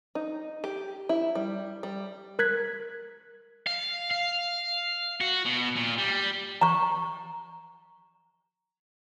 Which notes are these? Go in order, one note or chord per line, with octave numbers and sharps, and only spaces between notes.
D#4
G4
E4
G3
G3
A#4 F#6 G#6 B6
F5
F5
F#4
B2
A#2
G3
A#5 C#6